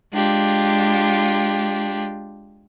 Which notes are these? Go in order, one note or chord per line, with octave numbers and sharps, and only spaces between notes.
G#3 D4 F4 G4